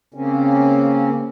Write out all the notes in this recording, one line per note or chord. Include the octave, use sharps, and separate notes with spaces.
C#3 A#3 C4 C#4